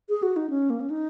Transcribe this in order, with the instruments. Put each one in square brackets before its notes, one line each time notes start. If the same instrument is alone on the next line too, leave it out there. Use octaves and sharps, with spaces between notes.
[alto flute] G#4
F#4
D#4
C#4
A#3
C#4
D#4